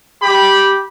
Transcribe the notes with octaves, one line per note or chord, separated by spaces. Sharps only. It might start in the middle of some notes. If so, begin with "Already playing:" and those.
G4 G5 B5